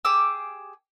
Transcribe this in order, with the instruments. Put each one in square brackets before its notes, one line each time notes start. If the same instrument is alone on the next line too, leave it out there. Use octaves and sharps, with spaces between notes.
[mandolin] G4 G#4 D6 E6